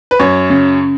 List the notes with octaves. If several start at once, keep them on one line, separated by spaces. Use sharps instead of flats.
B4
F#2 C#5
C#3